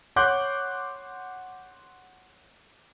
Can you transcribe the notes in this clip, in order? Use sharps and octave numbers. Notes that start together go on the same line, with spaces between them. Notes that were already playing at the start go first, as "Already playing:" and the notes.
C#5 F#5 C6 D6 F#6 G6